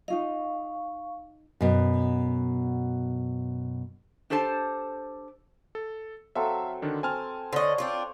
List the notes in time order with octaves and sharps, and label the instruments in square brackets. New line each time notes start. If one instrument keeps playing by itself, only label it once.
[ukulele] D#4 F4 D#5 [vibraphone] F5 C#6
[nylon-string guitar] F#2 B2
[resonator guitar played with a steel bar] D4 G4 A4 C5 A5
[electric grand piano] A4
[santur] F#3 C4 A4 [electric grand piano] E5 F5
[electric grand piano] D3 D#3 D4
[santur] C4 [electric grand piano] G#5 A5 F6
[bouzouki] D3 D#5 [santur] C5 C#5
[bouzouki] C4 D4 F4